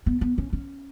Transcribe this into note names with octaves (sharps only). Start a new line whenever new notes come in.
B3
B3
C#4
C#4